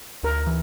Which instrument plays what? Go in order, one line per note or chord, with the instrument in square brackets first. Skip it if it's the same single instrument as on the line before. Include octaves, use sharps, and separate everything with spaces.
[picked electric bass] D2 [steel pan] A#4
[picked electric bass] E3